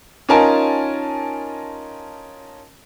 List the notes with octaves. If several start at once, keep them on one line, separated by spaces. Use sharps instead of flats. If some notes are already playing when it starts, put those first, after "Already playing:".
C#4 D#4 F4 A#4 G#5 A5